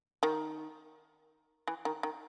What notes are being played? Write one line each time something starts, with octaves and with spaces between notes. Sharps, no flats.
D#3
E3
D#3
D#3